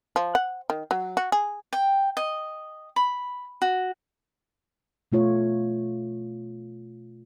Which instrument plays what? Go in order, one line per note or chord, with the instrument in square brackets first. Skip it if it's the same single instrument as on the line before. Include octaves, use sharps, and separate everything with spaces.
[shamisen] F3
F#5
D#3
F#3
F#4
G#4
[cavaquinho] G5
D#5
B5
F#4
[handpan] B2 A3 F4 C#5